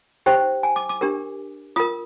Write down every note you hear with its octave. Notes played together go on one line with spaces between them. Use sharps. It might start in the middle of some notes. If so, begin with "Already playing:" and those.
D#4 G4 C5 G5
G#5
D6
D6
D4 G4 A#4
F4 A#4 D#6